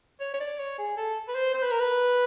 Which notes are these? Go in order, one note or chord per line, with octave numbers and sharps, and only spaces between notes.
C#5
C#5
D5
C#5
G#4
A4
B4
C5
C5
B4
A#4
B4